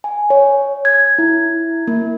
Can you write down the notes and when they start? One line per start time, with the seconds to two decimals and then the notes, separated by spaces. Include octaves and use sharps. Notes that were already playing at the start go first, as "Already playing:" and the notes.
0.04 G#5
0.30 C#5
0.85 G#6
1.18 E4
1.88 A#3